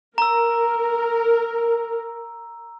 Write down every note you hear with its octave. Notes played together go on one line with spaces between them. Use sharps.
A#4 A#5 E6